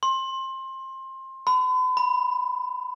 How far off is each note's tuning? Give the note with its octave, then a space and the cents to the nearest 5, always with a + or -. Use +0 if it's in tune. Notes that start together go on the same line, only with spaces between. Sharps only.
C6 +25
B5 +45
B5 -5